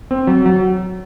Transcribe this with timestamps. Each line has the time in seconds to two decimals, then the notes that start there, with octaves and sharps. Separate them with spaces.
0.11 C4
0.27 F#3
0.46 F#3